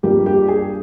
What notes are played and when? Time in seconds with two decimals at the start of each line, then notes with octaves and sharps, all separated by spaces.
0.03 G2 G3 A#3 F4 G4
0.26 G4
0.48 G#4